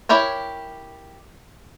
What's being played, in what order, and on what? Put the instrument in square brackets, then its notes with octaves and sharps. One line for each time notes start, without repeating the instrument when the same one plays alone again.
[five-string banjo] E4 G4 A#4 C#5